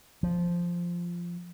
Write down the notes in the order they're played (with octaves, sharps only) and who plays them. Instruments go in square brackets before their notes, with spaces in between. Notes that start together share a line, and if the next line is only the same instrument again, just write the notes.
[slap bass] F3